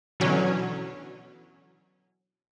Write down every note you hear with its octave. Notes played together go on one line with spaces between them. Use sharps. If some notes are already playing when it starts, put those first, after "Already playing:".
B2 D3 E3 F#3 C#4